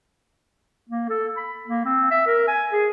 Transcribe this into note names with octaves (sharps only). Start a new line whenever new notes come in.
A#3
A4
B5
A#3
C4
E5
A#4
G#5
G#4